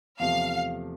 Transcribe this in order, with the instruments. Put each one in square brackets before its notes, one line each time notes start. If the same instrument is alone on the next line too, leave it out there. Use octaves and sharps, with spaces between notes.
[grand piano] E2 C3 F3 A3 [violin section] F5